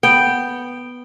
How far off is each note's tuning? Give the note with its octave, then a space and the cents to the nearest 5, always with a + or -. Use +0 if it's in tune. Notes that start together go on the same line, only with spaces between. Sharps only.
B3 +0 G5 +0